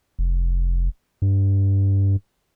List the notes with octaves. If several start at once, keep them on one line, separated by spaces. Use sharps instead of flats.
F1
G2